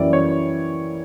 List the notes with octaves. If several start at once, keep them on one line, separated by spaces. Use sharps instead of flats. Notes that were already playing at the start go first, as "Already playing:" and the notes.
Already playing: F#2 E3 G3 A#3 C#4 D5 E5
C#5